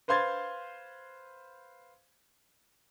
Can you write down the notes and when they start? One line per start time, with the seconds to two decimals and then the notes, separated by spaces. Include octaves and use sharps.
0.08 B4 C5 F5 C6 G#6 A6